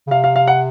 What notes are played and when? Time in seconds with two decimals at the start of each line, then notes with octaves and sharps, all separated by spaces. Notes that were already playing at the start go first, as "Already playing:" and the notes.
0.07 C#3
0.11 C3 F5
0.24 F5
0.36 F5
0.47 F#5